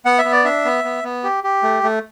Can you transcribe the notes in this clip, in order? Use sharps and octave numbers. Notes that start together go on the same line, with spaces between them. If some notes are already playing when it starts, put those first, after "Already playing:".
B3 F#5
E5
B3
D5
D4 E5
B3
B3
B3
G4
G4
A3
A3